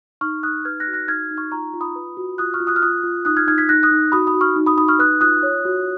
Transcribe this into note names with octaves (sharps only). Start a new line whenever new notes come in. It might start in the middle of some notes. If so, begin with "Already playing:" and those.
D#4 C#6 F6
D#4 D#6 F#6
B4 F6 G#6
F#6 A#6
F#4
F#6 A#6
D#4 F6 G#6
D#4
C#6 F6
F4 A#5 C#6
F4
B5 D#6
B4
F#4
F4 D#6 F#6
C#6 F6
F4
D#6 F#6
F6
F4 D#6 F#6
F4
D#4 D#6 F#6
F6 G#6
D#4 F6 G#6
G#6 B6
D#4 F#6 A#6
D#6 F#6
D#4
F#4 B5 D#6
B5 D#6
F#4
C#6 F6
D#4
B5 D#6
D#4 B5 D#6
C#6 F6
B4 D#6 F#6
F4 D#6 F#6
C#5
F#4